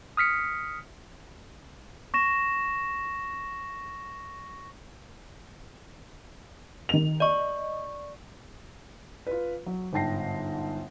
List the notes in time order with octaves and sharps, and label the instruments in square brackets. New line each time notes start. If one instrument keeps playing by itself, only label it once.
[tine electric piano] D#6 F6 B6 C#7
[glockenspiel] C#6 A#6 E7
[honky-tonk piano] D#3 F7
[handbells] D5 C#6 [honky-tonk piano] D#5
[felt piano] F4 B4
F#3
G1 G#2 G5 A5 A#6 C7